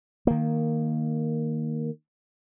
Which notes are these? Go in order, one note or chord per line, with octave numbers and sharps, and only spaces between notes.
D#3 A#3